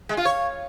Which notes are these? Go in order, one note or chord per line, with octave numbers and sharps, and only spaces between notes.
G#3
F4
C#5